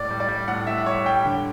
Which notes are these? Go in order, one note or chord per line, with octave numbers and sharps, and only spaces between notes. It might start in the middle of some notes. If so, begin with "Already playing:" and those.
Already playing: A2 D5
G3
D5
G3
A2 F#5
A2 E5
G3 C#5
G3 G5
D3